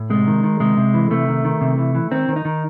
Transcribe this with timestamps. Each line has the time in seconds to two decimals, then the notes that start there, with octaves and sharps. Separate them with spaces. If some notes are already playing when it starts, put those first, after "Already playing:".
Already playing: A2
0.10 C3 G#3
0.27 D#3
0.43 D#3
0.60 C3 G#3
0.77 C3
0.94 E3
1.10 C3 A3
1.28 D#3
1.45 D#3
1.61 C3
1.78 E3
1.95 E3
2.11 D#3 C4
2.28 D#3
2.36 D#4
2.45 D#3